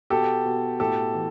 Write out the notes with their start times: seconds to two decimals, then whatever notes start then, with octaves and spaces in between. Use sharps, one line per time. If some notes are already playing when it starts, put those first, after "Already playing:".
0.10 B2 G4 A4
0.45 B2
0.80 A2 G4 A4
1.14 E3